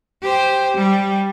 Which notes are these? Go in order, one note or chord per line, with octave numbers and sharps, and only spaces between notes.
G4 C5
G3